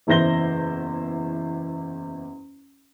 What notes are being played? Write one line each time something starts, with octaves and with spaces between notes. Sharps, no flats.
F#1 E2 E4 C5 A#6 G7